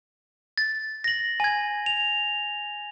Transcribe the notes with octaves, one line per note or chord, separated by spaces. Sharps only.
A6
A#6 F#7
G#5 G#6
F7